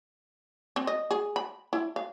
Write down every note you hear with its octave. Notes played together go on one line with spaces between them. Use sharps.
C4
D#5
G#4
B5
E4
F5